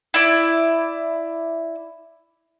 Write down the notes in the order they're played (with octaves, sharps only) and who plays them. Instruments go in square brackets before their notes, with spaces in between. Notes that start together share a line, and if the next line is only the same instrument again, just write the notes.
[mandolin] E4 D5